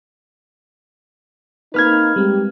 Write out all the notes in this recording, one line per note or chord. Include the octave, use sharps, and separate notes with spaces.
A#3 C4 D#4 B4 F6 G#6
G3 G#3 C4 G4